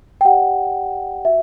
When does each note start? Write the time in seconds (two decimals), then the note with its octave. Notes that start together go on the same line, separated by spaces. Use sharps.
0.21 G5
0.25 G4 D5 F#5
1.25 F#4 E5